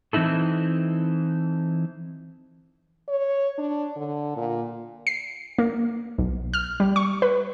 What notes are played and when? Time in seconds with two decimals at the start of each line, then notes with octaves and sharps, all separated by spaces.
0.13 E3 C4 D#4 E4 A4
3.08 C#5
3.58 D4
3.96 D3
4.36 A#2
5.07 C7
5.58 A#3
6.18 B1
6.54 F6
6.80 G3
6.96 C#6
7.22 B4